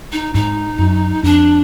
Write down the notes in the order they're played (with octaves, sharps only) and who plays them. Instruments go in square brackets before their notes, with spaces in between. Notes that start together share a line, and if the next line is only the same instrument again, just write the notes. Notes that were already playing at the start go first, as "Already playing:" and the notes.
[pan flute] D#4
[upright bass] G#2 [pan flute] D#4
[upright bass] F#2
[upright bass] F2 [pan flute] D4